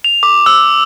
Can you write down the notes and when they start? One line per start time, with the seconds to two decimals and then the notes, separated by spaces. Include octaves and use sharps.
0.04 F7
0.23 D6
0.46 E6